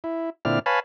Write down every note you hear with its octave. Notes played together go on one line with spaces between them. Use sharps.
E4
A#2 D3 C4 E4 D5 F6
B4 C#5 F5 G#5 A5 B5